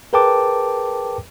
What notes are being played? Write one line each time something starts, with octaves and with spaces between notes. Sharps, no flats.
G#4 A#4 B4 G5 A5 D6